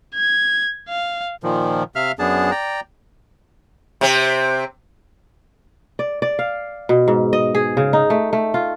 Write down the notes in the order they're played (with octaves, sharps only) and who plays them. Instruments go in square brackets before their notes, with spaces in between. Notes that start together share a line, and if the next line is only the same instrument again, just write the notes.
[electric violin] G#6
F5
[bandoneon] A#2 D#3 F3
C3 E5 F5 F6
F#2 B3 D4 G#4 A5
D5 G5 A#5
[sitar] C3 C4
[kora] D5
D5
F5
B2
G#2
D#5
G#4
C#3
D#4
A3
A3
F4